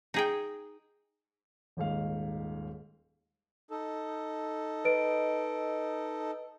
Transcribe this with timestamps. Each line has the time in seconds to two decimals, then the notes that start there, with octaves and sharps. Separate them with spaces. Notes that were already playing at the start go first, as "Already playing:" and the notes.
0.14 D#4 G#4 G5
1.77 D#1 D#2 G#2 F5
3.71 D#4 A4
4.85 B4 D#5 D7